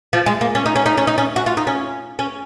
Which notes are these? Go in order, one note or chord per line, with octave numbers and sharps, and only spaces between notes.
F3
G#3
A#3
C#4
D#4
C#4
D#4
C#4
D#4
C#4
F#4
F4
D#4
C#4
C#4